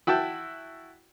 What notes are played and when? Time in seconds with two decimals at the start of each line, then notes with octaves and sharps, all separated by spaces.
0.07 E4 F#4 G5 A5